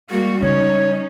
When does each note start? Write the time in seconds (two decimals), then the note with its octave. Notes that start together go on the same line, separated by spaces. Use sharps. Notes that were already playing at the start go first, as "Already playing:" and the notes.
0.10 G3 G#3 A#3 F#4
0.43 C#3 C#4 D#4 C#5